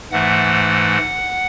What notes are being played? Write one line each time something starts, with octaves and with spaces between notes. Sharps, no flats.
G#2 E3 A3 F#5